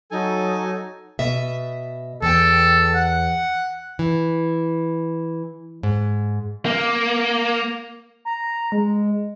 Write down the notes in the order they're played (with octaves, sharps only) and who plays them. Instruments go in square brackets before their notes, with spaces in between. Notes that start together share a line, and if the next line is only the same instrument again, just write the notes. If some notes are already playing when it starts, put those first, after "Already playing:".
[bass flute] F#3 [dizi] D#4 [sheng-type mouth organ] A4 G#5
[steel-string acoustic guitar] B2 D#5 E5
[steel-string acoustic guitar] E2 G5 [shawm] A4
[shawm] F#5
[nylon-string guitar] E3
G#2
[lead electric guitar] A#3
[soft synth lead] A#5
G#3